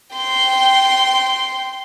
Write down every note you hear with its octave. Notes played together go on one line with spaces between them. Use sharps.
G5 C6